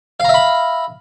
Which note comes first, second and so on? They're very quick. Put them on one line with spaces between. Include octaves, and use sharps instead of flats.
F5 A#5 E5 B5